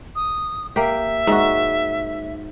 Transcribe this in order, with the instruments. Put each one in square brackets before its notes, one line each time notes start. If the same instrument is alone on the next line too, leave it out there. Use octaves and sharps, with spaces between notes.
[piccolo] D#6
[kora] A#3 G4 [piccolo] E5
[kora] G#2 F#4